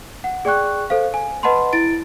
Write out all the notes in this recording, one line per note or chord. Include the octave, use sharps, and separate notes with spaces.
F#5
G#4 D5 G5 C#6 F#6
A4 C5 F5
G#5
B4 D#5 F#5 A5 B5 C6
E4 A6 D7